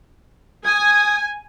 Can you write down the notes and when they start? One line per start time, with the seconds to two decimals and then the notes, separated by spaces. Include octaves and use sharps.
0.65 G#5 D#6 G#6